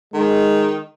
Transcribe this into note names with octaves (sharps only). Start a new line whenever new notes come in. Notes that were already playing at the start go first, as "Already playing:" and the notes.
D#3 G#3